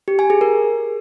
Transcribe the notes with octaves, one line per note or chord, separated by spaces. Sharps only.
G4
G#5
G#4
A#4